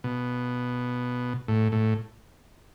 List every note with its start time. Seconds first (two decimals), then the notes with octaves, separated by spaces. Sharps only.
0.04 B2
1.48 A2
1.72 A2